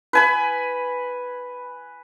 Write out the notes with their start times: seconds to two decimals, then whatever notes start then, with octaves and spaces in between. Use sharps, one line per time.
0.13 B4 G#5 B5